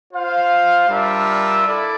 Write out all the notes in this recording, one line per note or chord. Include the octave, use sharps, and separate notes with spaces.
F4 C5 F5
G3 D4 F4 A#4 E5
E4 A4 D5